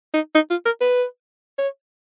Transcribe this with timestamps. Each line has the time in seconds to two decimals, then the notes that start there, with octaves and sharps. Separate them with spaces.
0.14 D#4
0.35 D#4
0.50 F4
0.66 A#4
0.81 B4
1.58 C#5